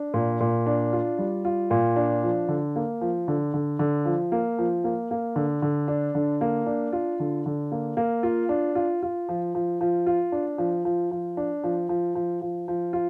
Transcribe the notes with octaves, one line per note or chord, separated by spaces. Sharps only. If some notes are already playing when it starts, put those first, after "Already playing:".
Already playing: D4
A#2
A#2
D4
F4
G3
F4
A#2
D4
F3
D3
A#3
F3
D3
D3
D3
F3
A#3
F3
A#3
A#3
D3
D3
D4
D3
A#3
D4
F4
D3
D3
A#3
A#3
F4
D4
F4
F4
F3
F3
F3
F4
D4
F3
F3
F3
D4
F3
F3
F3
F3
F3
F4